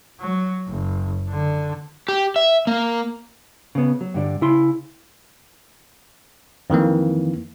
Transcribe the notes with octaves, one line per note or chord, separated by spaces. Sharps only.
F#3
F#1
D3
G4
E5
A#3
C#3 B3
F#3
G2 D3 D4
C#3 E4 C6
F2 D#3 E3 A#3